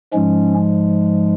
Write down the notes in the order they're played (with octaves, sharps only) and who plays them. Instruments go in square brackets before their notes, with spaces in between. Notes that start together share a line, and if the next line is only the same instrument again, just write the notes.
[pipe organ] G#2 F3 G#3 C#4